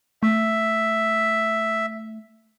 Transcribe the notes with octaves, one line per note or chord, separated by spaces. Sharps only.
A3 E5